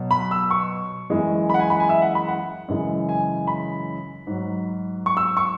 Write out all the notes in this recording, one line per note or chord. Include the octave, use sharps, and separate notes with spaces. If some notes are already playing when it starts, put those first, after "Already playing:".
Already playing: B2 F#3
B5
E6
C#6
F#2 E3 G#3
B5
F#5
G#5
B5
G#5
E5
F#5
B5
F#5
F#2 C#3 E3 G#3
G#5
B5
G#2 F#3
C#6
E6
C#6